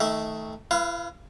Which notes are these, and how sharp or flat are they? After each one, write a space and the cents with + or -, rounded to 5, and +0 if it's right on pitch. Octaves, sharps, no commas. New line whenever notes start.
D#3 +25 A3 +0 E5 +0
E4 +45 B4 +0 F5 -15